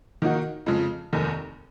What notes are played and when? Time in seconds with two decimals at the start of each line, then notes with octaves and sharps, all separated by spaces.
0.22 D#3 A#3 D#4 F#4
0.66 F2 C#3 G#3
1.13 F1 D#2 D#3